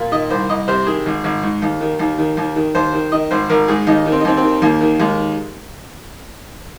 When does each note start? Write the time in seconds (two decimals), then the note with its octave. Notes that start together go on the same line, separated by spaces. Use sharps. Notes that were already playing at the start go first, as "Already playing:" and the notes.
Already playing: A#2
0.12 D#3 D#5
0.30 C2 C5
0.49 C2 D#5
0.68 C3 C5
0.87 D#3 G#4
1.06 G#1
1.24 G#1
1.43 G#2
1.62 D#2
1.81 D#3
1.99 D#2
2.18 D#3
2.37 D#2
2.56 D#3
2.75 D#2 C5
2.93 D#3
3.12 D#3 D#5
3.31 G#1 C5
3.49 G#1 A#4
3.68 G#2 G#4
3.87 D#2 D#4
4.06 D#3
4.12 C4
4.20 D#4
4.25 D#2 C4
4.37 C4
4.43 D#3
4.62 D#2 A#3
4.81 D#3
5.00 D#2 G#3